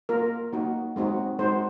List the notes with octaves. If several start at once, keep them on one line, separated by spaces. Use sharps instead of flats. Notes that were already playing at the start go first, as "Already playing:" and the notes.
A#3 F4 A#4
A#3 D#4 F#4
G#3 C4 D#4 F#4
G#3 D#4 F#4 C5